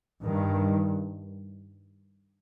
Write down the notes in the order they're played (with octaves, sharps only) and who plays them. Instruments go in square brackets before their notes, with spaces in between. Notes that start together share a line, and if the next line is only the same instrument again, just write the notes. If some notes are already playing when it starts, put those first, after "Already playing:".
[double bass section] G2 D#3